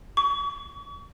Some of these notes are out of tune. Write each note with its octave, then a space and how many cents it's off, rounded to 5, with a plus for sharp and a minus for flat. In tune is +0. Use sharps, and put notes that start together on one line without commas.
C#6 +40